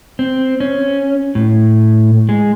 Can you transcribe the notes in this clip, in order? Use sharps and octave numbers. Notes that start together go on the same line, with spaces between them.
C4
C#4
A2
G#3